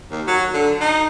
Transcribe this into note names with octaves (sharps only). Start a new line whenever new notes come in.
D#2
F#3
D3
D#4